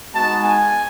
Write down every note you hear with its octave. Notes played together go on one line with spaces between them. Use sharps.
G#3 B3 D#4 F#4 A5
G#5